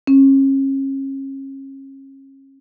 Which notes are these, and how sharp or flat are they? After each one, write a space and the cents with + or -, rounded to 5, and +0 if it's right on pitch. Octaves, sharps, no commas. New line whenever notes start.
C#4 -35